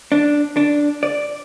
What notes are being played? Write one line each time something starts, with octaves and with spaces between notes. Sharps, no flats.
D4
D4
D5